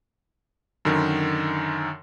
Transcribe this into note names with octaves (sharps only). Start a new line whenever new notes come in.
F#2 D3 D#3